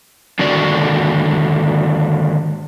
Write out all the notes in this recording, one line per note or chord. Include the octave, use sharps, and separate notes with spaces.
D3 D#3 G#3 A#3 F#4 D5